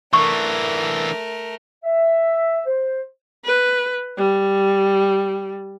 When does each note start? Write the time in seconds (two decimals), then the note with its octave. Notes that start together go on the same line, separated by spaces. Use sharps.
0.13 E3 A3 D4 A#4 C#6
1.84 E5
2.65 C5
3.45 B4
4.18 G3